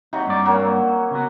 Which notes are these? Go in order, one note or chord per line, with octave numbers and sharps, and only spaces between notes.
C3 F#3 D#4
G2 D5
F#3 A#3 C#4
C#3 B3 F#4